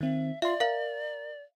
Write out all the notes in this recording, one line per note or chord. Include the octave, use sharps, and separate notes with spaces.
D#3 C4 E5
F4 D5 E5 F5 C6
A#4 F5 F#7